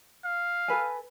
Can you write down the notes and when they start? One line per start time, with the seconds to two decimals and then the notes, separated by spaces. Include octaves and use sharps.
0.25 F5
0.68 A4 B4 G#5